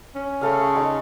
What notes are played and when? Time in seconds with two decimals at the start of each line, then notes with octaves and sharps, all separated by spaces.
0.15 C#4
0.41 C#3 A3 A4 F5
0.75 G#3 D#4